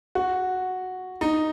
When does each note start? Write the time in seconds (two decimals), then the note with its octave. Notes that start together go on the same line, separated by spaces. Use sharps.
0.15 F#4
1.21 D#4